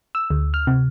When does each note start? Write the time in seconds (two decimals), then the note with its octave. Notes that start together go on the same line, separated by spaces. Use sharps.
0.15 E6
0.30 D2
0.54 F6
0.67 C3